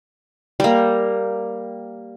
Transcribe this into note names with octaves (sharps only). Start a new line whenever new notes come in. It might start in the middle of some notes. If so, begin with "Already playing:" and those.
G3 A#3